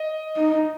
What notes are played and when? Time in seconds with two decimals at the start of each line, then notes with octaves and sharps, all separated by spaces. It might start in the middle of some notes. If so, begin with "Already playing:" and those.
Already playing: D#5
0.36 D#4